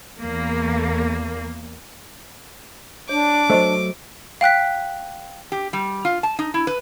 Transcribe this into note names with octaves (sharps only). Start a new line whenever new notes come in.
E2 A#3
D4 C#5 D6
F#3 A3 C5 D#5 C#6
F5 G5 F#6 B6
G4
G3
F4
A5
D#4
E4
B4